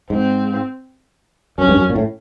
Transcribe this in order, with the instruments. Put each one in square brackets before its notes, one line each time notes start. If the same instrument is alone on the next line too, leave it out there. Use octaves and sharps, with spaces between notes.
[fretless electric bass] G#2 [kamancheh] C4
[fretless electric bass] F#2 [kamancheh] C#4
[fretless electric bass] G2
F#2
A#2
A2